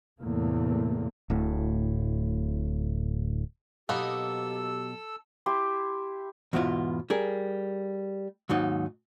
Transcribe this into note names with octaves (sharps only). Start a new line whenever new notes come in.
E2 A2 C3 A3 A#3
D1 A2
B2 F#3 A#3 B3 D#4 G4 A4 E6
E4 G4 E5 C6
E2 G#2 B2 E4 F4
G3 G#4 A#4
D#2 G#2 F#3 D#4